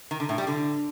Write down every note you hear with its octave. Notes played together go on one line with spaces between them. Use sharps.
D#3
D3
A2
G3
D3